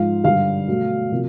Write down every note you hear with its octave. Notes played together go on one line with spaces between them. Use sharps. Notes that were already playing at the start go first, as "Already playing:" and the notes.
Already playing: G#2 F3 F5
G2 D3 G3 F5
B2 F#3 A3
C3 F3 A#3